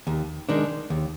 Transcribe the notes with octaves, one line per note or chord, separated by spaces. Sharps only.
D#2
D#3 G#3 D4
D#2